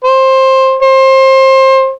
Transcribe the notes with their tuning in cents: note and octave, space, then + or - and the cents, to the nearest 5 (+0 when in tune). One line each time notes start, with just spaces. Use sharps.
C5 +15
C5 +25